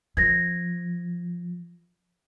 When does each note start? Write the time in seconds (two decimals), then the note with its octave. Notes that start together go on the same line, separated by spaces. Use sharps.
0.17 F3 G#6 A#6